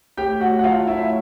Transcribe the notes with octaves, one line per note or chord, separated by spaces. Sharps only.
A2 G4 G5
F#4 F#5
F#5
F#3 A3 F4 F5
E4 E5